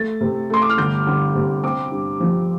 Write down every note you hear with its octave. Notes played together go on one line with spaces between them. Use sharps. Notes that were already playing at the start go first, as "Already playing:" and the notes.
Already playing: A3 A6
C3
A3 C6
D6
F6
G1 G6
G1
C3
C4 D6
G2
F3